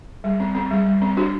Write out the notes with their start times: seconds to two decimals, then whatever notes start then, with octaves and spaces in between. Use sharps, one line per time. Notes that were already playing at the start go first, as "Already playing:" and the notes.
0.24 G3
0.40 C4
0.55 C4
0.71 G3
0.86 G3
1.02 C4
1.17 D4 F#4